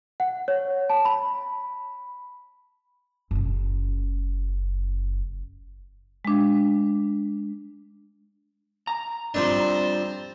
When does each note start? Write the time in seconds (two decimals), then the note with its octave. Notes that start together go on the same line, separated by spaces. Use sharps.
0.20 F#5
0.48 C#5
0.90 A5
1.05 B5
3.31 F#1 C#3
6.25 G#3 D4
8.87 A#5
9.34 F3 G3 C4 D4 C5